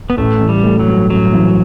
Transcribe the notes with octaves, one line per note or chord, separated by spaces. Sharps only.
B3
A1 A3
E3
G3
A3
F#3
G2
A1 F#3
E3